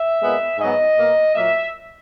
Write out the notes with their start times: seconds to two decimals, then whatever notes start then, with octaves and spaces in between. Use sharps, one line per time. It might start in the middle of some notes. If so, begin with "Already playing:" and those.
Already playing: E5
0.21 A#2 G#3 B3
0.59 G#2 F#3 B3 D#5
0.97 B2 A#3
1.35 A#2 F#3 A#3 E5